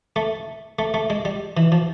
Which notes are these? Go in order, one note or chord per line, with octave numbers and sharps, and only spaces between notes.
A3
A3
A3
G#3
G3
E3
F3